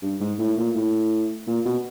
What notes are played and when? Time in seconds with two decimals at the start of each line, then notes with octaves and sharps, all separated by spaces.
0.02 G2
0.20 G#2
0.39 A2
0.57 A#2
0.75 A2
1.47 A#2
1.65 B2